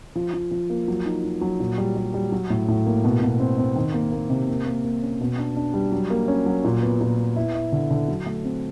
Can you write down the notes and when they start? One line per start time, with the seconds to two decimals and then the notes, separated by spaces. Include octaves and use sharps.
0.16 F3
0.34 F3
0.51 F3
0.70 A#3
0.88 F#3
1.06 D#4
1.24 D#4
1.41 F#3
1.60 A#2
1.78 G3
1.96 G3
2.14 G3
2.32 F#3
2.50 A2
2.68 A2
2.86 A#3
3.04 B2
3.23 B2
3.40 C4
3.58 C4
3.76 D#3
3.94 A#3
4.12 A#3
4.30 C3
4.48 A#3
4.66 A#3
4.84 A#3
5.02 C#4
5.20 B2
5.38 D4
5.56 D4
5.74 G3
5.92 F#3
6.10 A#3
6.28 C#4
6.46 F#3
6.64 A#2
6.83 B3
7.01 A#2
7.18 B3
7.36 E4
7.55 E4
7.72 D3
7.91 D3
8.08 F#3
8.26 A3
8.45 C4